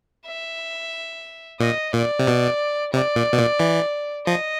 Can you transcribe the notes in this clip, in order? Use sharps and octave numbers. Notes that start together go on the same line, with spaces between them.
E5
A#2 D#5
A#2 D5
C3
B2
C3 D5
A#2
B2
A#2
E3
F3 D#5